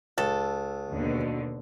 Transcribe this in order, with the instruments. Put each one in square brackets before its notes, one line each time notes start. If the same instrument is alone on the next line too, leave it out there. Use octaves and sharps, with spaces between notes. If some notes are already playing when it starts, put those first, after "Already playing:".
[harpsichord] C#2 [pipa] A4
[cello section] D#2 B2 D3